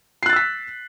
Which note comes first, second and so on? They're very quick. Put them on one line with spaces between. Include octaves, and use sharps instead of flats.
C7 F#6 A6 E6 B6